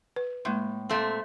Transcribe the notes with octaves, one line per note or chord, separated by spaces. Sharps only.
B4
A2 G#3 A#3 C6
A#2 A3 C4